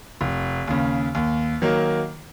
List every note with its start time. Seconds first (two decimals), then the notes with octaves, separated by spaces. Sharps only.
0.21 F1
0.67 D#2 C#3
1.15 D#2
1.62 D#3 F#3 A#3